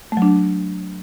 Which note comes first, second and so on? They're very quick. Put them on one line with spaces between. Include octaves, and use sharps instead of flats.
A3 F#3 D4